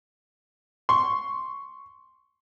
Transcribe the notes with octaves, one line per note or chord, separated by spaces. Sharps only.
C6 C#6